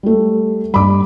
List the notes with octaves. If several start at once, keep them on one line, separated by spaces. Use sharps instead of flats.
G3 A3
G2 G3 B5 D6